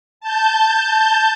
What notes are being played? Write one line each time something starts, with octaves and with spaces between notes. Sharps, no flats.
A5 G6